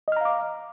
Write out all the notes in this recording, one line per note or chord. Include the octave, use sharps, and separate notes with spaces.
D#5 F5 A#5 D6 F6